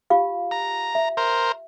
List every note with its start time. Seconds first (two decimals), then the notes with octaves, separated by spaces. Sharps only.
0.10 F4 G4 F5
0.51 A#5
0.95 E5
1.17 A#4 C5